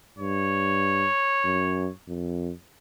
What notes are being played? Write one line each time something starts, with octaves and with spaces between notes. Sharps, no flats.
G2 C#5
F#2
F2